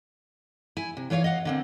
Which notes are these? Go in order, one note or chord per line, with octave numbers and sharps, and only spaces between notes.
E4 G#5
C3
E3 F4 C#5 D5 F5
D#5 F5 F#5
D3 A#3 C4